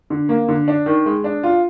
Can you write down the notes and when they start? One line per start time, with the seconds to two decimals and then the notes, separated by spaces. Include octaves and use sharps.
0.10 D3
0.29 A#3
0.48 D3
0.68 D4
0.86 D#3
1.06 G#3
1.24 D4
1.43 F4